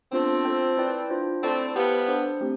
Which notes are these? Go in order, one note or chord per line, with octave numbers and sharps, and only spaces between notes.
A3 B3 C4 D4 F4 C5
F4 A4 C5 G5
E4 B4 D5 G5
D4 F4 C5
A3 C4 E4 A4 D5 A5
G3 B3 G4 C5 F5 A5
D4 A4 C5
A3 C4 G4